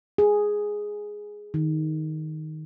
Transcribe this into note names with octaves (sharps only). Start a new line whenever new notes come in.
G#4
D#3